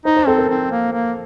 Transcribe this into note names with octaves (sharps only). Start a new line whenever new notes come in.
D#4 C5
C5
C4 A4
A#4
C4
A#3
A#3